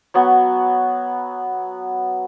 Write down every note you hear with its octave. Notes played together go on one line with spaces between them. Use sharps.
F#3 B3 F#4